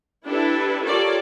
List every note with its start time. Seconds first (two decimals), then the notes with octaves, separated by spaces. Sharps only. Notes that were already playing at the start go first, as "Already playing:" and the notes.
0.25 D4 E4 G4 A4 B4
0.83 F4 G4 A4 A#4 C#5 D5